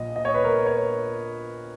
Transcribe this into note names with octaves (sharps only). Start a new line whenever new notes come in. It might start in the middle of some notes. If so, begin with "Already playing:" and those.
Already playing: A#1 A#2 D#5
D#5
C#5
B4
A#4
C#5